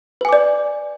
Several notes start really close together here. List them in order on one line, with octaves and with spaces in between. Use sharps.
B4 G#5 D6 D5